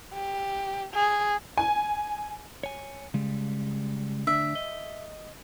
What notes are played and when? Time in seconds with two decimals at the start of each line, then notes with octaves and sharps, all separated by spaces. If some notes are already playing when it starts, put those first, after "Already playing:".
0.13 G4
0.94 G#4
1.57 G#5
2.63 C#5 G#5
3.14 C#3 G3 G#3
4.27 D2 G#2 D4 E5
4.55 D#5